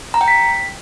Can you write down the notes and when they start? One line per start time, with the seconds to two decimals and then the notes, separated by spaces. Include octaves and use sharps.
0.14 A#5
0.21 G5
0.28 B6